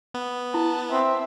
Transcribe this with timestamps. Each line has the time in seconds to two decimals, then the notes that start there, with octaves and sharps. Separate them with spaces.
0.14 B3
0.54 E4 A5
0.92 C4 E5